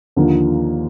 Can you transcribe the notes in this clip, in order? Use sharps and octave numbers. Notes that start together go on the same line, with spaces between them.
D#2 D3 F3 A#3